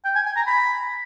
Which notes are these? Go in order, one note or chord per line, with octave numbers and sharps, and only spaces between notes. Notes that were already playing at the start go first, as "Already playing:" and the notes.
G5
G#5
G#5
A#5
B5